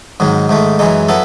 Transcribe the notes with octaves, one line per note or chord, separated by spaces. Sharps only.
G#2 D#3 F#3
G#2 D#3 A3
F#2 E3 G#3 D#4
F#3 B3 E4 A4